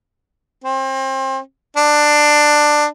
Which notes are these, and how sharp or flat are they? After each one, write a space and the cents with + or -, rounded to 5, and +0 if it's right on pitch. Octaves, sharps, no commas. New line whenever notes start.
C4 +30
D4 +15